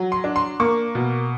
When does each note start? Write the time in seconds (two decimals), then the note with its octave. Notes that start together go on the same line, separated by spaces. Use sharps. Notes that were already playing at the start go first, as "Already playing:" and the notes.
Already playing: F#3
0.12 C6
0.24 D4
0.36 C6
0.60 A#3 C#6
0.95 B2